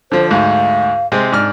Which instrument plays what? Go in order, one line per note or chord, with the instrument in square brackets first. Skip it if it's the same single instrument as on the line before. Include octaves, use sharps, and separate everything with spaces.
[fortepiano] D3 F3 [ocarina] C5
[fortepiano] D2 G#2 [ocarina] F5
[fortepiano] C3 G#3 C4
G#2 D4 F6